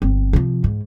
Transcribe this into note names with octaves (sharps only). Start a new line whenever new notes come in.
G1 C4
C3 F3
G#2